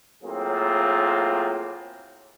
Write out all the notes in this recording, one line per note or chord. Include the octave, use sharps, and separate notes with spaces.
A2 F#3 A#3 C4 F4 G#4